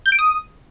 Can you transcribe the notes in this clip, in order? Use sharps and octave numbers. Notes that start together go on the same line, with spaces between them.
G6
D7
D#6